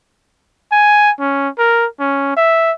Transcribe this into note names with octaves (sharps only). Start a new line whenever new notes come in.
G#5
C#4
A#4
C#4
E5